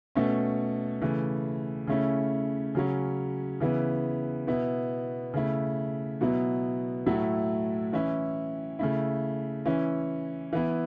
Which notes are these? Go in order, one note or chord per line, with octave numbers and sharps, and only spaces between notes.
B2 A3 C#4
C#3 E3 A3
C#3 A3 C#4 E4
C#3 F#3 C#4
C#3 E3 B3 E4
B2 B3 E4
C#3 A3 E4
B2 F#3 B3 E4
A2 F#3 A3 E4
E3 C#4 E4
C#3 A3 E4
E3 C#4 E4
E3 B3 E4